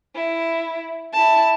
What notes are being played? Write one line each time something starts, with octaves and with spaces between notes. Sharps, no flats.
E4
E4 A5